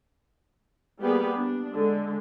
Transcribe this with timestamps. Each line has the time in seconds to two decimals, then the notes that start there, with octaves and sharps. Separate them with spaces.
1.00 G3 A#3 B3 G4 G#4 B4
1.38 D4
1.74 D3 G#3